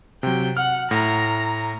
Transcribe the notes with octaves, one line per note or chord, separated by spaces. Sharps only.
C3 F#3 G5
F#5 F6
A2 A#5 A#6